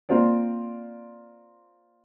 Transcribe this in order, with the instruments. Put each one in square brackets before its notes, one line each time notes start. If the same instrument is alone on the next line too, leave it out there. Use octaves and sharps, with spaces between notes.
[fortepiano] A#3 C4 F4 C5 D5